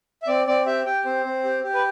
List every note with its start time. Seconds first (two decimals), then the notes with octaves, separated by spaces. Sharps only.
0.22 E5
0.27 C4 D5
0.47 C4 D5
0.66 G4 E5
0.86 G4 G5
1.05 C4 C5
1.25 C4
1.44 G4
1.63 G4
1.74 B4